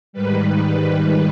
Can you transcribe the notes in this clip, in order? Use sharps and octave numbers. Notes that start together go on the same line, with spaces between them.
G#2 D#3 G3 B4